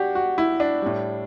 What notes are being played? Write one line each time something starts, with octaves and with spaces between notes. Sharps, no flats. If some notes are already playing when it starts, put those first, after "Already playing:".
Already playing: D4 F#4 G4
F#4
E4
D4
A2 G3